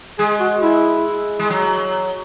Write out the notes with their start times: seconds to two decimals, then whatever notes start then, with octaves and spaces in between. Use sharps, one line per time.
0.19 G#3 G#4
0.40 F#4
0.62 E4
1.40 G#3
1.50 F#3